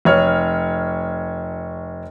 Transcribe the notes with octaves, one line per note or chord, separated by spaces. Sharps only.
F1 C#5 F6